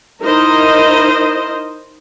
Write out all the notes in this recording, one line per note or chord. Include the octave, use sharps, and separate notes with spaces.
D#4 E4 A#4 C5 D#5